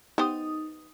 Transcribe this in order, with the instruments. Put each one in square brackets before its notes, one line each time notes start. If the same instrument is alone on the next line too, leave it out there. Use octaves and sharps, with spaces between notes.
[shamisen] B3 G4 C5 [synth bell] D#4 D#6